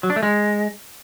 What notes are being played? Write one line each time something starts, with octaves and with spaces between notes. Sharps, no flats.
F#3
D4
A3
G#3